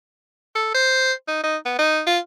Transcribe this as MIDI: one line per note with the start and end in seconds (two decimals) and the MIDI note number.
0.56 0.71 69
0.75 1.13 72
1.28 1.44 63
1.44 1.57 63
1.66 1.78 59
1.79 2.02 63
2.07 2.19 65